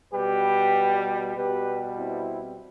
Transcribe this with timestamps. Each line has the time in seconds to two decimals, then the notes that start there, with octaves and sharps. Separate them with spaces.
0.13 B2 G3 G4 B4
1.35 B2 G3 G4 B4
1.97 C4 E4